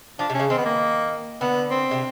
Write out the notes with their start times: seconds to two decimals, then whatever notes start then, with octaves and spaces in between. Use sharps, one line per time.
0.19 F3 D4
0.30 C3
0.34 C#4
0.40 C#3
0.50 D#3 C4
0.58 B3
0.65 A#3
1.41 D3 B3
1.71 C4
1.91 C3